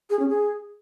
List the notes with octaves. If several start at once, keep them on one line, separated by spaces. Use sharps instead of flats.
G#4
C#4
G#4